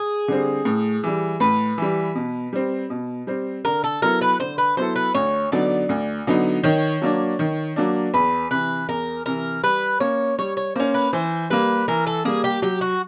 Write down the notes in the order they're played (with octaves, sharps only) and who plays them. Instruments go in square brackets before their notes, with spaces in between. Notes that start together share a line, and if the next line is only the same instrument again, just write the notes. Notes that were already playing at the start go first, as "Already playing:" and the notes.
Already playing: [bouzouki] G#4
[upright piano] D3 G3 C4
A2
E3 G3
[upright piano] A2 [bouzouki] B4
[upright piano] E3 G3
B2
G3 C4
B2
G3 C4
[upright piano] D3 [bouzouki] A#4
[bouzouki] A4
[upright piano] F#3 B3 E4 A4 [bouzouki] A#4
[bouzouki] B4
[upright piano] D3 [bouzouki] C5
[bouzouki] B4
[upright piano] F#3 B3 E4 A4 [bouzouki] C5
[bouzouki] B4
[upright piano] D2 [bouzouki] C#5
[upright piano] D3 F#3 B3 D#4 [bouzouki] D5
[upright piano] D2
D3 F#3 B3 D#4
[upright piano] D#3 [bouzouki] C#5
[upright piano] F#3 A#3 D4
D#3
F#3 A#3 D4
[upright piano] E2 [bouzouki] B4
[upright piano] C3 E3 [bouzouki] B4
[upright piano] E2 [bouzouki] A#4
[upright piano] C3 E3 [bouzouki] A#4
[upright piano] G3 [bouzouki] B4
[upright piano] A#3 C#4 [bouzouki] C#5
[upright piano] G3 [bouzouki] C#5
[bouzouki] C#5
[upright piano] A#3 C#4 [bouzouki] C5
[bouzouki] B4
[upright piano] E3 [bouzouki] C5
[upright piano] G3 A#3 [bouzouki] B4
[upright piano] E3 [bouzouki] A#4
[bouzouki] A4
[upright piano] G3 A#3 [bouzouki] G#4
[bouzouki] G4
[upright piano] F#3 [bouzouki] G4
[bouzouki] F#4